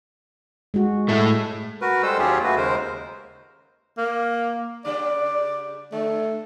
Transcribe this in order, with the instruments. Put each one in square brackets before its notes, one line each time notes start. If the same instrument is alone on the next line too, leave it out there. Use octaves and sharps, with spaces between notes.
[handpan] G#3 F#4
[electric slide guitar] A2 A3
[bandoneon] F#4 A#4 B4
G3 G#3 A4 C5 E6
D#2 F#3 C#4 F4 G4 G#4
A3 F#4 B4
D#2 C#3 G#3 A#4 C5
[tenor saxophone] A#3
[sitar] C#3 G3 D4 [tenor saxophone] D5
[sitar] D3 [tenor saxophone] A3